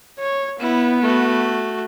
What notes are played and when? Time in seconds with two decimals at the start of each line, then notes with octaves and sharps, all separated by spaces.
0.19 C#5
0.60 B3 E4
1.02 A3 F#4